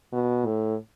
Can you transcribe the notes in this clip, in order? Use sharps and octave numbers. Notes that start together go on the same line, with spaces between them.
B2
A2